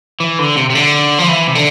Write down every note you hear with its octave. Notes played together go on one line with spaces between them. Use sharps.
E3
D3
C3
C3
D3
F3
E3
C3
D3